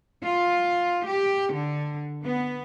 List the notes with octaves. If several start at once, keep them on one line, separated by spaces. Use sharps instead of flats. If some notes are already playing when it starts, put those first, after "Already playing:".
F4
G4
D3
B3